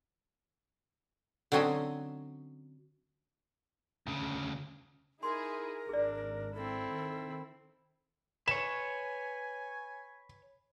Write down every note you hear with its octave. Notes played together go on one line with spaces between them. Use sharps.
D3 F#3 C4 C#4 D#5 E5
D2 C#3
D#4 E4 G#4 A#4 C6
G#1 D4 G#4 D5
C4 E4 A4
D#3
B4 C#5 G#5 E7